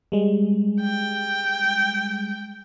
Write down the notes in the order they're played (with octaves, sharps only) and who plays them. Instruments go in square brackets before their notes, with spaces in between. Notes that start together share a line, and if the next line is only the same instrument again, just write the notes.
[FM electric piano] G3 G#3
[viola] G5